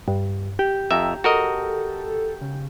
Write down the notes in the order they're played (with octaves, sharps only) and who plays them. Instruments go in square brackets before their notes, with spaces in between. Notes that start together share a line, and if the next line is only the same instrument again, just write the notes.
[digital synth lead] G2
G4
[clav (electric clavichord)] F2 E5 [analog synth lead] A#5
[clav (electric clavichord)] F#4 A#4 D#5 [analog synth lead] A4
[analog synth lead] C#3